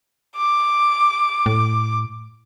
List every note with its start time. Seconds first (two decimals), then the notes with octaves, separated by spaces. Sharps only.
0.36 D6
1.46 A2